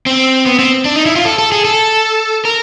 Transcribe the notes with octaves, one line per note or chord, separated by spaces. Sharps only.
C4
B3
C4
D4
D#4
E4
F4
A4
A4
G#4
A4
A#4